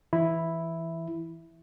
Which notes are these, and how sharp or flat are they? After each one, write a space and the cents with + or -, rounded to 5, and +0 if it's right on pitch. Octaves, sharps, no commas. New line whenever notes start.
E3 +0 E4 +0